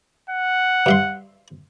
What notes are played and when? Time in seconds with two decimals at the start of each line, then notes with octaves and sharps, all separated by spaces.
0.30 F#5
0.86 G2 E5 C6